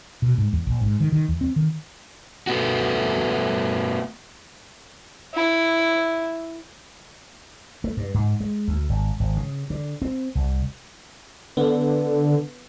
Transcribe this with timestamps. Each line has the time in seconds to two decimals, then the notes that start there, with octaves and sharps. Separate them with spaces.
0.22 B2
0.38 G#2
0.53 E2
0.67 A#1
0.81 G#2
1.00 D#3
1.12 D#3
1.28 E2
1.41 C4
1.56 D#3
2.47 A3 B3 F#4
5.34 E4
7.84 A3
7.97 G2
8.14 G#2
8.40 G#3
8.68 D2
8.89 G#1
9.20 G#1
9.37 C#3
9.70 D3
10.02 C4
10.35 C2
11.57 D3 B3